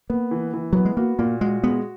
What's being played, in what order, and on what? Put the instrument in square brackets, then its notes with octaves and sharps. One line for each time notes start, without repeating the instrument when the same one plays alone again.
[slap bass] A#3 [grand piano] B3
[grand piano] E3
E3
[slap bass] F#3 [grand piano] B3
[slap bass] G#3
[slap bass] A#3 [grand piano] F#4
[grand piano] A#2 [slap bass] A#3
[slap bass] G#3 [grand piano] F#4
[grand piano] G#3 [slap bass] B3